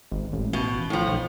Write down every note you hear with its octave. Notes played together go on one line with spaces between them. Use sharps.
G#1
A1
B2
A2 F3
B1